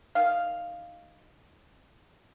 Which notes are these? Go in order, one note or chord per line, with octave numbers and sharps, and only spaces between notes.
D#3 F5